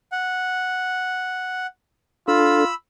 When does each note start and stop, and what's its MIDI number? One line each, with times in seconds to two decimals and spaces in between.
0.12 1.67 78
2.28 2.65 62
2.28 2.70 65
2.28 2.65 69
2.28 2.74 83
2.28 2.74 88